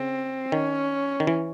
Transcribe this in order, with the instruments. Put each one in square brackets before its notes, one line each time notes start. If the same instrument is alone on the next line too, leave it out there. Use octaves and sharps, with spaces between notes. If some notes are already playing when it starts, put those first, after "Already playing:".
Already playing: [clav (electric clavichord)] C#3 [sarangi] C4
[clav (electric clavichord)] D#3 [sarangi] C#4
[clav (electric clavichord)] D#3
E3